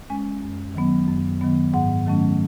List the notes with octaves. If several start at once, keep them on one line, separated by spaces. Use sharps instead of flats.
G#3 C#4 G#5
F#2
D#3 F#3 B3
F#2
D#3 F#3 B3
G#2 F#5
D#3 F#3 A3 C#4